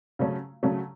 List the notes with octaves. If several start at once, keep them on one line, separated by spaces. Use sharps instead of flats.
C#3 F#3 A3 C#4
C#3 F#3 A3 C#4